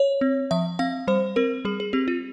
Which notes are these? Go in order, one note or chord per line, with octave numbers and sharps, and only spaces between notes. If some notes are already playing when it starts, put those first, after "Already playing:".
Already playing: C#5
C4
F3 E5
C4 F5
G3 C5
C4 A#4
G3 G#4
G#4
C4 G4
F4